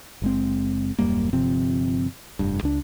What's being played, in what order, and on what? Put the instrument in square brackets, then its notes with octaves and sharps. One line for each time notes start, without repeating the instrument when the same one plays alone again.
[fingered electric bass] F#1 G#3 C4
D#1 F#2 G3 A#3
G1 C3 F3 C4
F1 G2
C#2 D4